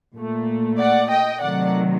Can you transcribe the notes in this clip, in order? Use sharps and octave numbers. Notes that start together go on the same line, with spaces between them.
A#2 A3
D5 F#5
D#5 G5
C3 D#3 F#3 A3 D5 F#5